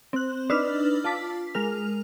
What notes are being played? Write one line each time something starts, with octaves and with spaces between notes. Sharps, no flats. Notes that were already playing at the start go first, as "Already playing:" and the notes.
C4 F#6
D4 D#4 B4 E6 F6
F4 A5 D6 B6
G#3 A#4 F6 F7